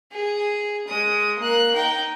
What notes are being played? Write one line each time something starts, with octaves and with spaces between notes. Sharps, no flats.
G#4
G#3 D#6
A#3 F#6
D#4 G5